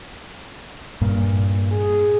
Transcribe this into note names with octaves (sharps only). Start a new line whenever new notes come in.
G2 A#2
G#4